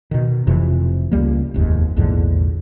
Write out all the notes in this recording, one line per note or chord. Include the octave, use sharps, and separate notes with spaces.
B2 D#3
F1 F2 C3 E3
C#2 G3 A#3
F1 D#2 G#2
A#1 E2 G#2 D3